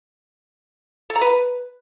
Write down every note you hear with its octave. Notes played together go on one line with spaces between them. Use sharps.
A4
A#5
B4